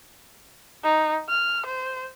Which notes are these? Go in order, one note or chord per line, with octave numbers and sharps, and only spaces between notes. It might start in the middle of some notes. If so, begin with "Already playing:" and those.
D#4
F6
C5